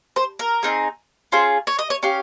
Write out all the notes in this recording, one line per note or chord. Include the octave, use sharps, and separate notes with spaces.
C5
A#4
C4 D#4 G#4
C#4 F4 G#4 C5
C#5
D#5
C#5
C#4 G4 F5